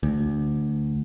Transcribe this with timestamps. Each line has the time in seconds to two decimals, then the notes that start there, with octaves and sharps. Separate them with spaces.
0.03 D2